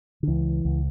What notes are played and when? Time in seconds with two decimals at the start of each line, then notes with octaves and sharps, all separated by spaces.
0.23 D3
0.27 C#2 E3
0.65 C#2